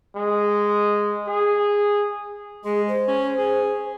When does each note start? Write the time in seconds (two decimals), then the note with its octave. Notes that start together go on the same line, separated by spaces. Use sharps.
0.16 G#3
1.27 G#4
2.64 G#3 G#4
2.88 C5
3.08 C#4
3.37 G#4